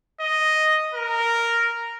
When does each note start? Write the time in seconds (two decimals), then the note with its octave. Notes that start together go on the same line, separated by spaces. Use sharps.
0.21 D#5
0.94 A#4